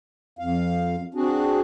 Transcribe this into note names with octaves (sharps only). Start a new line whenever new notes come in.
F2 F5
C4 D4 F#4 G#4